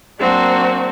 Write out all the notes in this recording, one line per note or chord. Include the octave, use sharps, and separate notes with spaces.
F#3 A#3 C4 D4 F#4